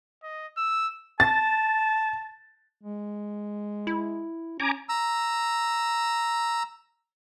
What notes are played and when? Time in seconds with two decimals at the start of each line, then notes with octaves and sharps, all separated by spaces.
0.23 D#5
0.57 E6
1.20 A5 A6
2.82 G#3
3.87 E4
4.60 C#4 G#5 A#5 D6
4.89 A#5 E6